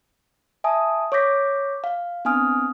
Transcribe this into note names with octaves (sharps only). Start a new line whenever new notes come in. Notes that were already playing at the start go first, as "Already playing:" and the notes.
E5 G#5 A5 D#6
C#5 C#6 D6 G6 A#6 B6
F5
B3 C4 D4 G#5 D#6 F6